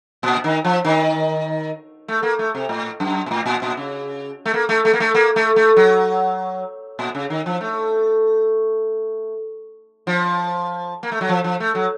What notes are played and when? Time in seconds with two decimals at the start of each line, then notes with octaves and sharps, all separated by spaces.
0.23 A#2
0.44 D#3
0.64 F3
0.85 D#3
2.08 A3
2.23 A#3
2.39 A3
2.55 C3
2.69 A2
3.00 F#2
3.26 A#2
3.31 A2
3.46 A#2
3.62 A#2
3.77 C#3
4.45 A3
4.54 A#3
4.69 A3
4.85 A3
4.93 A#3
5.00 A3
5.14 A#3
5.36 A3
5.56 A3
5.77 F#3
6.99 A#2
7.15 C#3
7.30 D#3
7.46 F3
7.61 A3
10.07 F3
11.03 A#3
11.12 A3
11.21 F#3
11.29 F3
11.44 F3
11.60 A3
11.75 F#3